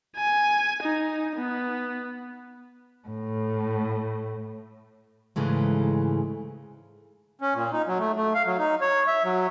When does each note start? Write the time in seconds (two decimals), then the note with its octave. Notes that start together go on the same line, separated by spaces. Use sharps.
0.17 G#5
0.82 D#4
1.37 B3
3.07 A2
5.36 G#2 C#3 E3 G#3 A3
7.41 C#4
7.55 A#2
7.72 D#4
7.87 F#3
7.99 A3
8.16 A3
8.34 F5
8.46 F#3
8.59 D#4
8.81 C#5
9.08 E5
9.24 F#3